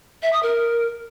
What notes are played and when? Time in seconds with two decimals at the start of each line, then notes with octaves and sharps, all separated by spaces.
0.23 E5
0.33 D#6
0.43 A#4